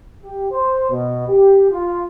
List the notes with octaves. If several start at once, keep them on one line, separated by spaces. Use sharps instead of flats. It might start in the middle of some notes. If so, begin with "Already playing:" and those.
G4
C5
B2
G4
F4